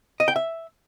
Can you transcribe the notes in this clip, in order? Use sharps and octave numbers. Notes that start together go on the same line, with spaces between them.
D#5
G5
E5